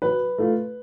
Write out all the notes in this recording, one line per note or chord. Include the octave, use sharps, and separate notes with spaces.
F#3 B4
A3 F4